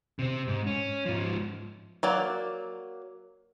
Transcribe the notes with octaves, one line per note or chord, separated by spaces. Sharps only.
C3 C4
G#2
C#4
G#2 F3
F#3 A#3 D5